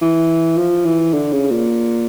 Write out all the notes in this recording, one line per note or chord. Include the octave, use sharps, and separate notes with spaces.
E3
F3
E3
D3
C#3
A#2